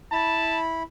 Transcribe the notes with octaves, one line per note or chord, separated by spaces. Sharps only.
E4 A5 B5